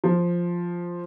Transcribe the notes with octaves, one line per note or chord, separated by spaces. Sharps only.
F3